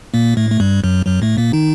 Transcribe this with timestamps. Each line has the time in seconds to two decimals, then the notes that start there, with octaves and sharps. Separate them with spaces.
0.14 A#2 A#3
0.37 A2 A3
0.51 A3
0.60 G2 G3
0.84 F#2 F#3
1.06 F#2 F#3
1.22 A2 A3
1.38 A#2 A#3
1.53 D#3 D#4